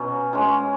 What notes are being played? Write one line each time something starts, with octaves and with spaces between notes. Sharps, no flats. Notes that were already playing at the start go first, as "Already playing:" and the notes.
Already playing: B2 F#3 C#4
G#3 C#4 G#4